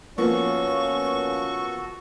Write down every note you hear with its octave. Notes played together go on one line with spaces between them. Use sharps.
F3 A#3 B3 C#4 F#4 A4 C#6